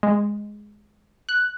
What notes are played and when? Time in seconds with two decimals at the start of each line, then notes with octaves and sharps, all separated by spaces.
0.03 G#3
1.29 F#6